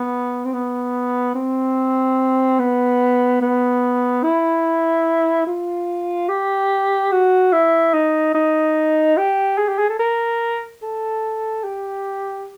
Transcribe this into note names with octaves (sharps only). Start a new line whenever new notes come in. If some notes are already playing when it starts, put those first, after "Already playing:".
Already playing: B3
C4
B3
C4
B3
B3
E4
F4
G4
F#4
E4
D#4
D#4
G4
G#4
G4
G#4
A4
A#4
A4
G4